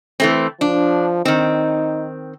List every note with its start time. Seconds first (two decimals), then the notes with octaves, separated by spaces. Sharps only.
0.20 E3 A3 C4
0.61 F3 D4
1.25 D#3 C4 D#4